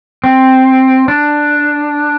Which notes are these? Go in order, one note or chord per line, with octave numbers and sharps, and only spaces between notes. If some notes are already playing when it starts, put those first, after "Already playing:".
C4
D4